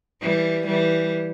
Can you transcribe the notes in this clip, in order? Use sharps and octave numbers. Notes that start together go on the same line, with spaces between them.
E3 G3
E3 G3